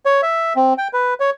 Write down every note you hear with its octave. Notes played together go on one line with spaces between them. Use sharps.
C#5
E5
C4
G5
B4
C#5